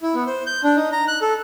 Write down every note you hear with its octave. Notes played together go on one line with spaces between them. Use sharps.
E4
B3
C5
G6
D4
D#4
A#5
F#6
A4